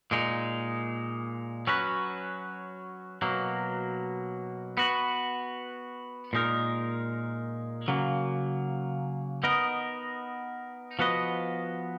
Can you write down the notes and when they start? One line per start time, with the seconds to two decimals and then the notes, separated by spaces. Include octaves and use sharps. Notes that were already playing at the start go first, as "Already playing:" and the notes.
0.11 A#2 G#3 D#4
1.67 F#3 C#4 F#4 B4
3.22 B2 F#3 A#3
4.77 B3 F#4 B4
6.33 A#2 G#3 D#4 A#4
7.88 C#3 F#3 A#3
9.44 B3 D#4 A#4 D#5
10.99 F3 B3 F#4 B4 D#5